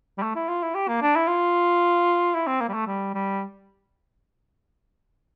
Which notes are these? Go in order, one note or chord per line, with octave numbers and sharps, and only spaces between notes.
G3
A3
E4
F4
E4
G4
A#3
D4
E4
F4
E4
C4
A#3
G3
A3
G3
G3